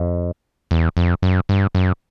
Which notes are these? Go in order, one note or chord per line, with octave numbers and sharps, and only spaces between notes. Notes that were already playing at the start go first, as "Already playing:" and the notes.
Already playing: F2
E2
F2
F#2
G2
F#2